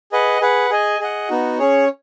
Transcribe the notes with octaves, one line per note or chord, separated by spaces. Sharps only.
G#4 B4 D#5 F#5
G#4 B4 F#5
G#4 D#5 G#5
G#4 D#5 F#5
B3 D#4 F#4
C#4 G#4 C#5